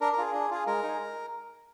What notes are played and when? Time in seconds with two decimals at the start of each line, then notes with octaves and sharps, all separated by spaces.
0.01 D4 A#4
0.13 A#4
0.18 F4 G#4
0.33 D4
0.50 F4 G#4
0.67 G#3 A#4
0.83 D#4 G#4